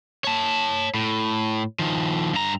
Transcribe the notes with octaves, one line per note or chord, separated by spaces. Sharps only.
C#5 A5
A2
D#3 F3
G2 A#5